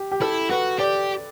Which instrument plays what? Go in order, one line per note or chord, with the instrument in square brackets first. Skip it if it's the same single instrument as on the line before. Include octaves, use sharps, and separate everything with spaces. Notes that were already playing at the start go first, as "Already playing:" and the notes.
Already playing: [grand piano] G4
G4
[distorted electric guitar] E4 [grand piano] A4
[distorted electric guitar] F#4 [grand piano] B4
[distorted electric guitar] G4 [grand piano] D5